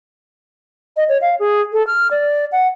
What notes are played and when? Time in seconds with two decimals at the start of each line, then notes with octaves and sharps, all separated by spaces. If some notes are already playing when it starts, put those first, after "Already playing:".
0.97 D#5
1.09 C#5
1.22 F5
1.39 G#4
1.73 A4
1.87 F6
2.11 D5
2.52 F#5